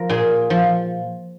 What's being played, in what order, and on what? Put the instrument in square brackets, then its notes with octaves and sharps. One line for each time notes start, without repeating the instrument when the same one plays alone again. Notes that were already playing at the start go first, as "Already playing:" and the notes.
Already playing: [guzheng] F3 A#4
A#2 G#4
F3